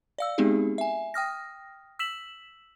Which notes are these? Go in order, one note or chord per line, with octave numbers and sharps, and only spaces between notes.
D5 F5 E6
G#3 B3 C4 D#4 G4 G#4
E5 G#5
G5 D#6 F6 A#6
E6 B6 E7 F#7